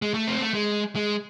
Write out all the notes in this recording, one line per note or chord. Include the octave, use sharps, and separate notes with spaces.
G#3
A3
C4
A3
G#3
G#3